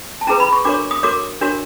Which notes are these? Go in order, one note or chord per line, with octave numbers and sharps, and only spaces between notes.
A5
C#4 E4 G#4 B4 A#5
B5
C#6
D4 F#4 A#4 C#5 D6
D#6
F#4 A#4 C#5 D6
D4 F#4 A#4 C#5